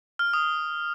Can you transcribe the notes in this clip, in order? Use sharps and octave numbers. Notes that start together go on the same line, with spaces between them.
F6
D#6